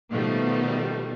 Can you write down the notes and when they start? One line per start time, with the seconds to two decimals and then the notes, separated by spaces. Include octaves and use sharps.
0.10 B2 D#3 F3 G3 A3 B3